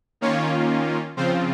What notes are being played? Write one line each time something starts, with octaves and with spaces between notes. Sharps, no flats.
D#3 A#3 C#4 F4 C#5
C#3 F3 C4 F4 C5